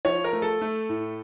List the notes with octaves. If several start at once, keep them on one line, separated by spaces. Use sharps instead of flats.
F3 C#5
A#4
A3
A4
A3
A2